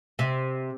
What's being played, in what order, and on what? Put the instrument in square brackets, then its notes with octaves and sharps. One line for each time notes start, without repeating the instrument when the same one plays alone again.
[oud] C3